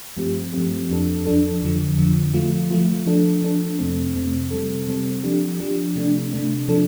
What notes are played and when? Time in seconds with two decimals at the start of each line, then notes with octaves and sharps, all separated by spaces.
0.17 G2 F3 A3 C4 G4
0.53 G2 F3 A3 C4 G4
0.90 F2 F3 D4 A4
1.26 F2 F3 D4 A4
1.62 F2 D3 F3
1.98 F2 D3 F3
2.34 F3 A3 F4
2.71 F3 A3 F4
3.06 F3 D4 A4
3.43 F3 D4 A4
3.79 F2 C3 A3 C4
4.15 F2 C3 A3 C4
4.51 C3 G3 C4 A4
4.87 C3 G3 C4 A4
5.24 F3 D4 G4
5.60 F3 D4 G4
5.96 C3 A3 D4
6.33 C3 A3 D4
6.68 C3 F3 D4 A4